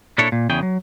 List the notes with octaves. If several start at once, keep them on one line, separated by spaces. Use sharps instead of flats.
A#2 D4 E4 A4 C#5
A#2
E2 C#3 G#4 G5
F#3